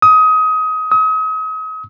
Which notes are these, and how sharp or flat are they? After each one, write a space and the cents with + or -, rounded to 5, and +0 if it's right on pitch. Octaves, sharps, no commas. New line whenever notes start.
D#6 +25
D#6 +40